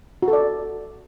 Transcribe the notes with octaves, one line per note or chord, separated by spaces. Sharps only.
F#4
A4
D5